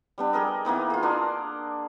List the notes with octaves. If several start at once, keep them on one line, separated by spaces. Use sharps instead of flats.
G3 B3 D4
G4 G#4 A#4 D#5
E3 A#3 B3 D#4
F4 G#4
D4 A#4 F#5 C6